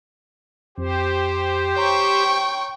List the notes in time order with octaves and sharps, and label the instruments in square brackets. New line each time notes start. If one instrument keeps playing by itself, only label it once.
[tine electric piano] F2 [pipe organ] G4 C5
[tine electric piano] C#5 A#5 C6 [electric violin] G5 C#6